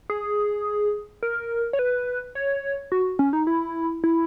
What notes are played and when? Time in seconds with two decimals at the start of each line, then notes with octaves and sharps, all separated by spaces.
0.10 G#4
1.23 A#4
1.73 C#5
1.79 B4
2.35 C#5
2.92 F#4
3.19 C#4
3.33 D#4
3.47 E4
4.04 E4